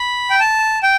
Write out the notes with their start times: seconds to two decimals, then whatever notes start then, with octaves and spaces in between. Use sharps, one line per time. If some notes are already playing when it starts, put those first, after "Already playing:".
Already playing: B5
0.30 G5
0.40 A5
0.83 G5